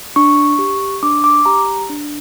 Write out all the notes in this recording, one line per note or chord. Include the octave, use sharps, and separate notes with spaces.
D4 C#6
G4
D4 D6
D6
G4 A#5
D4